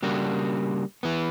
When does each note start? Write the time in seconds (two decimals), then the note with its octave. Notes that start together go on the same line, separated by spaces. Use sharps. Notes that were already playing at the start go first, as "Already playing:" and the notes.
0.03 C#3 G3 A#3 D4 F#4
1.03 E3 B3